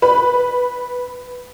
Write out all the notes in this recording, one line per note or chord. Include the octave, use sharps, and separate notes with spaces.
B4